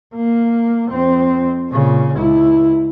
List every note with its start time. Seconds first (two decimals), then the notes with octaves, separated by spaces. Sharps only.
0.15 A#3
0.89 F2 C4
1.70 A#2 C#3
2.15 C#2 E4